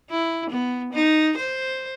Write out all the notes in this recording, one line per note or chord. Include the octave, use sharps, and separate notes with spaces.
E4
B3
D#4
C5